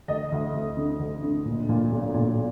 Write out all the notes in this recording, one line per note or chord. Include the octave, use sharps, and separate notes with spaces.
D2 D#5
D2
D2
D3
D2
D3
A#2
A#2
B1
A#2